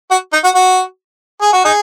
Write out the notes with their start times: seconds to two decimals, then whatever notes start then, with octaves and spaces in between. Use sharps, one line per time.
0.11 F#4
0.33 D#4
0.44 F#4
0.55 F#4
1.41 G#4
1.53 F#4
1.65 D#4 G#4